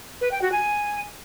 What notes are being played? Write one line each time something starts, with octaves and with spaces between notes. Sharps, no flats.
B4
G5
F#4
G#5